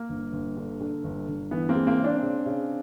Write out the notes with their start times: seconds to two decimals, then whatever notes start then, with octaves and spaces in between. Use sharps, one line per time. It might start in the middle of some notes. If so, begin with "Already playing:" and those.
Already playing: A#3
0.09 G1
0.33 G1
0.57 D3
0.80 D3
1.04 G1
1.28 G1
1.51 E3 B3
1.69 A#3 C4
1.75 G#3
1.87 A#3 C4
1.98 C#3
2.04 C4 D4
2.22 C#3
2.46 C#3